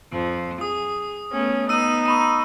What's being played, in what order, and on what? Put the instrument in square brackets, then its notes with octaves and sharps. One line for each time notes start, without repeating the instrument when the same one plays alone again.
[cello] F2 F3
[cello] G#4 [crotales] D#6
[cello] A3 B3 [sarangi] C#4
[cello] B3 [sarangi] D#4 [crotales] E6 D#7
[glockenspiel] A#5 B5 C#6 [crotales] D#7